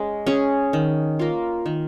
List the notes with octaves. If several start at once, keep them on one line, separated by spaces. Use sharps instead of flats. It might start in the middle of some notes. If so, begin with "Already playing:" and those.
Already playing: G#3 C#4
C#4 G#4
D#3
A#3 F4
D#3